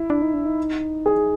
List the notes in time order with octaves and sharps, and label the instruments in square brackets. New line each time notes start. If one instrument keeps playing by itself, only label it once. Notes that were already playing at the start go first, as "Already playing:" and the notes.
Already playing: [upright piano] E4
[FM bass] D4
D#4
D4
D#4
[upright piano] G#4